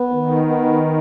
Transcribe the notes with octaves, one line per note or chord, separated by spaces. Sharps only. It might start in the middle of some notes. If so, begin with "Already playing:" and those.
Already playing: B3
D#3
B3